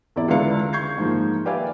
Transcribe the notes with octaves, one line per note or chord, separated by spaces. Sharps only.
E2 E4 D5
C#2 D3 E4 B4 F5 C#7
C#6 G6 G#6 C7
G#2 D#3 F3 A#3
G4 B4 D5 E5 F5 G#5